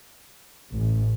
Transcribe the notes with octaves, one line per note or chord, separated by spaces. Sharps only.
A1